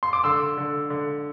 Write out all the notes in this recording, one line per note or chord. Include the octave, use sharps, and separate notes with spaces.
C6
D6
D3 C6 E6
D3
D3